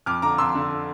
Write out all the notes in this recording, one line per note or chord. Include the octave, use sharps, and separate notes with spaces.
F2 D6 F6
D3 A#5 D6
F2 C6 E6
D3